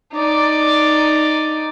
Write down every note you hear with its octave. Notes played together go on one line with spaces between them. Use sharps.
D#4 D5